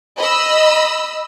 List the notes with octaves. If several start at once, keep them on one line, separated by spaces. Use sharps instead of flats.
D#5 B5 E6